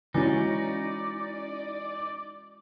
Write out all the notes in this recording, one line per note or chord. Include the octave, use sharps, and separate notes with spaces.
E3 G#3 C#4 D#4 E4 F#4 D5